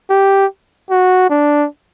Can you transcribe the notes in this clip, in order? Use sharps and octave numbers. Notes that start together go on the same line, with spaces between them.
G4
F#4
D4